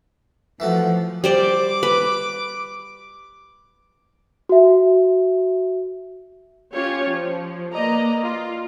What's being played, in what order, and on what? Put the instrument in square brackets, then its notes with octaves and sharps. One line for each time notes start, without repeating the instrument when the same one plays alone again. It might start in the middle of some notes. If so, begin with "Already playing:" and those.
[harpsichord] E3 A3 F#4 [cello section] F3
[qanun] G3 C5 D5 [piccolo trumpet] D6
[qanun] B4
[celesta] F#4 E5
[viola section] C#4 F4 G4 C#5
F3
A#3 B4 D5 D#5 A#5
F4